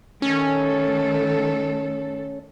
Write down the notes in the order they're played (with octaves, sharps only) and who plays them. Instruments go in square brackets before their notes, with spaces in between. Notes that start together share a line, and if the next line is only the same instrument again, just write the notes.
[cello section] D#3 A3 A4 [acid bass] C#4